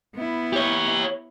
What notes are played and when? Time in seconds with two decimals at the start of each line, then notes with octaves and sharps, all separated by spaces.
0.15 B3 E4
0.53 G4 C#5